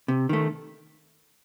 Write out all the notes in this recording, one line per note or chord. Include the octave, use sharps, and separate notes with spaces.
C3
D#3 A3